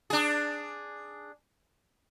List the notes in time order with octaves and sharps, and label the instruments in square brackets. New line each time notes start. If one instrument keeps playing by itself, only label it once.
[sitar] D4 G#4